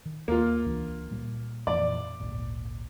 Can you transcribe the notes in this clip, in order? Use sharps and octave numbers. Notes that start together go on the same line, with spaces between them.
D#3
D#2 A#3 F4
C#2 E3 D4
A#2 G3
F2 A#2 E3 D5
G#1 D2 A#2